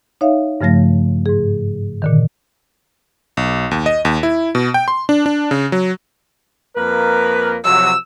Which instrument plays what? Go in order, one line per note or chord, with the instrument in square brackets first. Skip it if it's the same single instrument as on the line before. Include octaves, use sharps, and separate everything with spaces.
[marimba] D#4 C#5 E5 F5
G2 C#3 F3 A3 A#6
G#2 G#4
A#2 D3 D#3
[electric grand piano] B1
D#2
D#5
D#2
E4
B2
G5
C6
D4
D4
C#3
F#3
[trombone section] F2 A#3 A#4 [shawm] B4
[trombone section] C3 F3 F#3 [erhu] E6